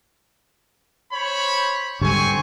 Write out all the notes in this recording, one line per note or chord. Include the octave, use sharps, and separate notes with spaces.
C5 C#5 B5
G#2 D3 G3 C4 G#5 C#6